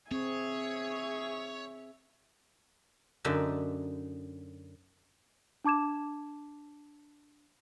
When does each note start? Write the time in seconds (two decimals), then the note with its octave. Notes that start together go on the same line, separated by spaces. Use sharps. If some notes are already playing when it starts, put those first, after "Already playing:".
0.11 C4 G#4 C#5 E5
3.25 F#2 D3 D#4 D5 E5
5.64 D4 A5 D6 G#6 E7